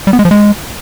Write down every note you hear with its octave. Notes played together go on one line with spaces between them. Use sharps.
G3
B3
G#3
F3
G#3